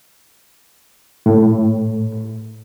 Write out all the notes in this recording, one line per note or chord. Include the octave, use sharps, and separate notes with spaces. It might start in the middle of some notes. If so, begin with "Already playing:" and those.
A2